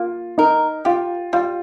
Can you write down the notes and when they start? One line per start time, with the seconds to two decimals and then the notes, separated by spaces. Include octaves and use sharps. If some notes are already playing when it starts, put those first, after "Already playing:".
Already playing: A#3 F4
0.38 D#4 A#4
0.85 F4 G4
1.33 G3 F4